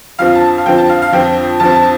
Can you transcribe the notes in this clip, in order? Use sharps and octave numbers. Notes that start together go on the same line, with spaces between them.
F2 D3 F3 C4 F5
A5
F5
F2 D3 F3 C4 G5
A5
F5
F5
F2 D3 F3 C4 G5
F2 D3 F3 C4 A5
A5